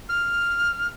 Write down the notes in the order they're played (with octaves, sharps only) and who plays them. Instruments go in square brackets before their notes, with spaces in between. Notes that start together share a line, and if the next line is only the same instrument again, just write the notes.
[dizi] F6